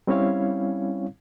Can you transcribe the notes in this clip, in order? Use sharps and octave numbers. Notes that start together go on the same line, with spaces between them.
G3 C4 C#4 E4 C#5 F5